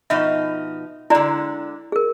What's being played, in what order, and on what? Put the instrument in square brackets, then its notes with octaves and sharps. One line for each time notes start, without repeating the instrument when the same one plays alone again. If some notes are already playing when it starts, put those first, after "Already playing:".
[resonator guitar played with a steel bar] B2 F3 D#4 [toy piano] E5 C#6
[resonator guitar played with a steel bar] D3 G#3 [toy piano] E4 D5 A#5
[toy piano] G#4 A#4